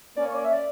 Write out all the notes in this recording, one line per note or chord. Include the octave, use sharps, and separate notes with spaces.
A#3 C#4 D5
C#5
D5
E5
D5